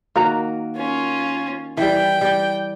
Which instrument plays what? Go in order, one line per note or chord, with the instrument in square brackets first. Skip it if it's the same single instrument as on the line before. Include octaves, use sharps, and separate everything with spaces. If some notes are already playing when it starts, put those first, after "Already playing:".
[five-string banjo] D#3 F#4 A#5 [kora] A#3
[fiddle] C#4 F4
[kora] E3 G3 [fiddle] G5
[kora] G3 G4